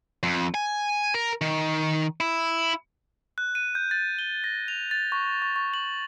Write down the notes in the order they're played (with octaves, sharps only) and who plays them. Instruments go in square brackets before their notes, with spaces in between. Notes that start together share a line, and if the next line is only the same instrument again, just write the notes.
[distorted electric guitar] F2
G#5
A#4
D#3
E4
[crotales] F#6
D#7
G6
A6
G7
A#6
F7
A6
C#6
C#6
C#6
F#7